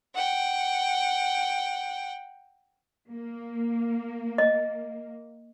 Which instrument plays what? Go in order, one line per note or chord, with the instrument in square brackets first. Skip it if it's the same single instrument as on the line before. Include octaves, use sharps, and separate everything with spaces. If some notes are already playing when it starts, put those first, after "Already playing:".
[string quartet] F#5 G5
[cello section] A#3
[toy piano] D#5